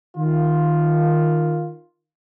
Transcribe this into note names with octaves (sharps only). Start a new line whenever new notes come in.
D#3 F4